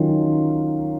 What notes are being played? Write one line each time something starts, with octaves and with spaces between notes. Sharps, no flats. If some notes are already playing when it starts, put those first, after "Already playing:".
Already playing: D#3 F#3 C#4 F4